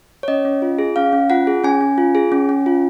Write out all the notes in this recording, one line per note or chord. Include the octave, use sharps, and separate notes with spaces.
C#5
C#4 D#5
C#4
F4
G#4
C#4 F5
C#4
F4 F#5
G#4
C#4 G#5
C#4
F4
G#4
C#4
C#4
F4